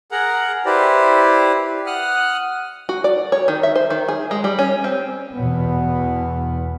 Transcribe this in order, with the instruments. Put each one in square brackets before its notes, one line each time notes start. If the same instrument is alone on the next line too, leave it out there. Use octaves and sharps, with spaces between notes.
[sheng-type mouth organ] G#4 A#4 F#5 A#5
E4 G4 B4 C5 D5
F#5 D#6 F6 F#6
[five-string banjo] F#4
D5
C#5
D#3
E5
C5
D#3
G#4
G#3
G3
C#4
C4
[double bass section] E2 B2 B3